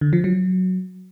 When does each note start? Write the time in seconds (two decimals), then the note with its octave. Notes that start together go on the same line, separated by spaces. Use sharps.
0.01 D3
0.13 F3
0.24 F#3